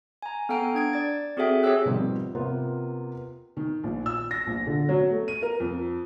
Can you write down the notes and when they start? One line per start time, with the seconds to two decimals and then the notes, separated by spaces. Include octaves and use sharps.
0.22 G#5 A#5
0.49 B3 A4 F5 G5 A#5 D7
0.75 D4 G#6 D7
0.93 D5 A6
1.37 C4 F#4 G#4 A4 E5 G5
1.63 G4 G#4 C#5 E5 E6 F#6
1.85 B2 D#3 F3 G3 C4
2.35 C3 A#3 B3 F4
3.57 D#3
3.84 A#1
4.06 E6
4.31 A#6
4.47 A#1
4.67 D3
4.89 F#3
5.10 A3
5.28 D#7
5.42 A#4
5.60 F2